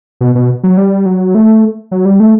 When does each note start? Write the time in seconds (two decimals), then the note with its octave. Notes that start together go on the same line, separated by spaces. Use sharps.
0.21 B2
0.35 B2
0.64 F#3
0.77 G3
1.06 F#3
1.35 A3
1.91 F#3
2.05 G3
2.20 A3